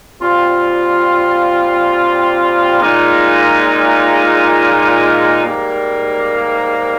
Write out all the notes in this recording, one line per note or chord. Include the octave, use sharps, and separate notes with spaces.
A#2 G3 C4 F4
A#2 G#3 D#4
G#2 G3 A#3